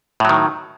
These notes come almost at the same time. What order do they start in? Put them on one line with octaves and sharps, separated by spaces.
A2 F#3 D#3